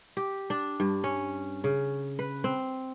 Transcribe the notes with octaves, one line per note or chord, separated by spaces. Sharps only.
G4
D4
G2
C#4
C#3
B4
C4